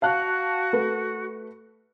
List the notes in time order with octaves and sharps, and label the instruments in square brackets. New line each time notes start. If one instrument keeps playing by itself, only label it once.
[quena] F#4 [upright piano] F5 A5 F#6
[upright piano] A3 B4